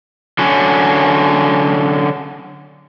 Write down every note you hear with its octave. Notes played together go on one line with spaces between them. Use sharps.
D3 F#3 C#4